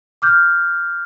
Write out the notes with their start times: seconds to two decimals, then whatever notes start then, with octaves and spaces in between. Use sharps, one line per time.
0.22 D6 F6 G6